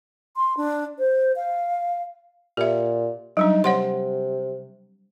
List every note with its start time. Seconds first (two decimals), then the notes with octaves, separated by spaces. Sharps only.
0.36 C6
0.57 D4
0.99 C5
1.36 F5
2.57 A#2 G4 E5
3.37 F#3 G3 D4 D#4
3.64 C3 C#5 F#5 C6